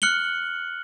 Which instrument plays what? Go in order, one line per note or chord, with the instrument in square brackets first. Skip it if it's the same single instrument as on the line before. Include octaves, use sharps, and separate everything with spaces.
[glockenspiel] F6 F#6 C#7 F#7 G7